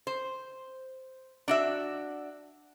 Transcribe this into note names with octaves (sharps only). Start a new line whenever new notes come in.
C5
D4 F#4 E5